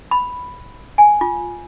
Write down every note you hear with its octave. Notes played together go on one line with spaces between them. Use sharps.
B5
G#5
F4